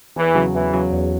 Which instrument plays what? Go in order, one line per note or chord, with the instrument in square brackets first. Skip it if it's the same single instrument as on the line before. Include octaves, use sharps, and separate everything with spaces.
[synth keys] E2 [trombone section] E3
[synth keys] C#3 F#3
[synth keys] E2 [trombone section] E3
[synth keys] C#3 F#3
E2